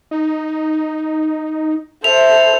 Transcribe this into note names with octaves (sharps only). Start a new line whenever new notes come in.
D#4
E4 A4 C5 F7